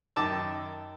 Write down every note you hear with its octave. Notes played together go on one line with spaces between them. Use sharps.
F#2 D#3 A5 D6 E6